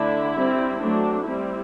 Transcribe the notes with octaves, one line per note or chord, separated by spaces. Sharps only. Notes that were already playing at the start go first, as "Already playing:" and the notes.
Already playing: D3 A3 D4 E4
G3 C4
F#3 A3 C4 D4
G3 C4 E4